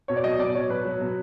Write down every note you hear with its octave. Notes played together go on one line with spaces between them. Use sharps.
B2 C#5
D5
F#3 D#5
B2 D5
F#3 C#5
B2 B4
F#3
B2